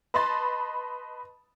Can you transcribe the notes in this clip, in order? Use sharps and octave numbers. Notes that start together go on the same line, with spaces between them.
B4 D#5 A5 B5 C6 A6